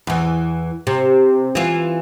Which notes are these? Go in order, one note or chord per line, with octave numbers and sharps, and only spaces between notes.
E2 E3
C3
E3 F4